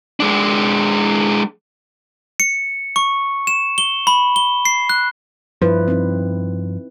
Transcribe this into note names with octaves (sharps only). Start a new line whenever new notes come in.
G#3 D4
C#7
C#6
E7
G7
B5
G7
C7
F#6
G2 F3 E4 B4
C4 D#4